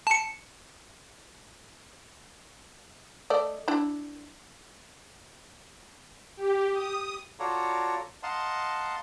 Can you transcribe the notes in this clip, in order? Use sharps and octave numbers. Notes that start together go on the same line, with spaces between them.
A5 C#7
A3 D5 D#5
D4 E4
G4
D#6
F4 F#4 A4 C#5 D5 A#5
D#5 F5 F#5 A5 A#5 C6